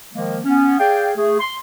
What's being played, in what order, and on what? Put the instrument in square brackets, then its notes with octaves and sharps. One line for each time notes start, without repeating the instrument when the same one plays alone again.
[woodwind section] D#3 F3 G#3 A#3
B3 C#4
G#4 D5 F5 G5
A3 G#4
C6